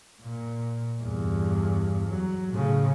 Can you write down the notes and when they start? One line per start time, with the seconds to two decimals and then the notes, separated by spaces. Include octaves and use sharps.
0.21 A#2
1.02 E2 G2
2.09 F#3
2.50 A2 C#3